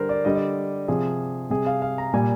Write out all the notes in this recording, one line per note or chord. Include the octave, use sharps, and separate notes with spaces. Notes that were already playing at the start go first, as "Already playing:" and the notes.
Already playing: D3 G3 A#4 C5
D5
D3 G3 D#5
D5
C3 F3 G#4
C3 G3 G#4
F5
F5
A#5
A#2 G3 G#5